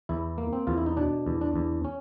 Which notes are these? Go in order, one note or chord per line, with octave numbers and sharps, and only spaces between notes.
E2 E4
A#3
C4
E2 F4
E4
D#4
B2 D4
E2
D4
E2
C#4